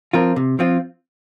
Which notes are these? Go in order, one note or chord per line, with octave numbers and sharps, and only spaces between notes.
F3 C4 F4 A#4
C3
F3 C4 F4